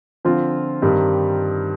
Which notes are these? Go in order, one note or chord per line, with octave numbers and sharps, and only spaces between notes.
D3 F3 C4 F4
G2 D#3 G3 C4 D#4